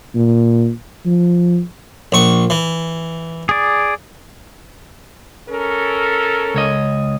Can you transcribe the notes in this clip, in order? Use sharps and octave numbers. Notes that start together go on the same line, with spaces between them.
A#2
F3
A#1 C#6
E3
G#4 D5
C#4 A4 A#4
C#2 C#5 D#5